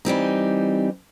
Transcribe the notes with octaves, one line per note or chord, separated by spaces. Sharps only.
E3 G3 C4 D#4